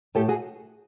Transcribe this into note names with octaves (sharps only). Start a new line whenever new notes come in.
A2 G4 A4
F#4 G#4